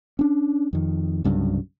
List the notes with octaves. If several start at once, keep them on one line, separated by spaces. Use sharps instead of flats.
C#4 D4
F2 D#3
C2 G2 C#3 F#3